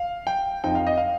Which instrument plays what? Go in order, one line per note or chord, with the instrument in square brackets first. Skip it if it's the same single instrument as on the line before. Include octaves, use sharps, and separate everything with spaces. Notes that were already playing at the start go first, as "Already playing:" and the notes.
Already playing: [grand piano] F5
G5
F2 F3 D#4 G5
F5
D#5
F5